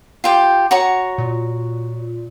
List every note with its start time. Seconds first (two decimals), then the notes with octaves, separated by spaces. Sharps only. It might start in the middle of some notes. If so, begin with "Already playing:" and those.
0.24 F4 G4 G5
0.71 F#4 C#5 A#5
1.18 A#2